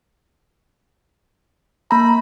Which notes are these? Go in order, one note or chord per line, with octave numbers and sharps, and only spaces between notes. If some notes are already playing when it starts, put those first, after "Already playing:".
A#3 A#5 B5